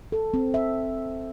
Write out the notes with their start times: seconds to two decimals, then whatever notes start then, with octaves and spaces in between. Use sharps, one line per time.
0.12 A4
0.34 C4
0.54 E5